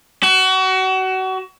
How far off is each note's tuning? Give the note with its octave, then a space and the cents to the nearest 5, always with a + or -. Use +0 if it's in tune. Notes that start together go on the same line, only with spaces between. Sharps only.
F#4 +30